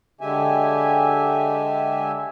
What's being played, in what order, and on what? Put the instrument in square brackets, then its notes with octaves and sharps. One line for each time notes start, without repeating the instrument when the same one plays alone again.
[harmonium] D3 G#3 G4 E5 G#5